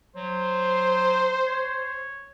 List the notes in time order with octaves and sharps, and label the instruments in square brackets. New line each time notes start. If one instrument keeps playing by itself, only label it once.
[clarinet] F#3 [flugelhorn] C5
[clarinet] C#5